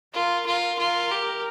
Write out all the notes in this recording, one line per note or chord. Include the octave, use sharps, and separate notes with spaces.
F4 A#4
F4 A#4
F4 A#4
G4